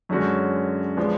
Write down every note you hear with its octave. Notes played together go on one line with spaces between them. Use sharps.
F#2 D3 G#3 C#4 F#4
F3 G#3 B3 D4